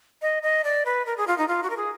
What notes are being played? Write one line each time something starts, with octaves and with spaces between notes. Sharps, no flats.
D#5
D#5
D5
B4
A#4
G#4
F4
D#4
F4
F#4
A#4
G#4